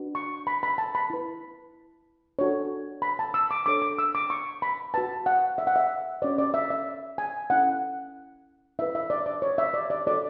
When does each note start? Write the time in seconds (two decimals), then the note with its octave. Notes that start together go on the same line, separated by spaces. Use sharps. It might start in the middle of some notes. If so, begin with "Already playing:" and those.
Already playing: D4 F#4 B4
0.15 C#6
0.47 B5
0.63 B5
0.78 A5
0.95 B5
1.10 E4 B4
2.39 D4 F#4 A4 C#5
3.02 B5
3.19 A5
3.34 E6
3.51 D6
3.66 D4 A4 C#5 D6
3.82 D6
3.99 E6
4.15 D6
4.30 C#6
4.62 B5
4.94 F#4 B4 A5
5.26 F#5
5.58 E5
5.67 F#5
5.76 E5
6.22 C#4 F#4 C#5 D5
6.38 D5
6.54 E5
6.70 E5
7.18 G#5
7.50 C#4 E4 A4 F#5
8.79 E4 B4 E5
8.95 E5
9.10 D5
9.26 D5
9.42 C#5
9.58 E5
9.74 D5
9.90 D5
10.07 F#4 A4 C#5 D5